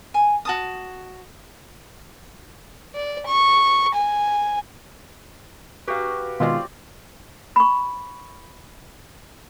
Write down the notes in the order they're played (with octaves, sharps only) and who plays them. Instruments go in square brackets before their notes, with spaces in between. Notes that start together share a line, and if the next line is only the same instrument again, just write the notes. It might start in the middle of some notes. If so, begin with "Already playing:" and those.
[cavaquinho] G#5
F#4 A5 D#6
[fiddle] D5
C#6
G#5
[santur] F#4 G4 [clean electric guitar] B4 F5
[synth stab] B2 D#3 G#3 [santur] C4 D5 [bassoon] F4
[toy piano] B5 C#6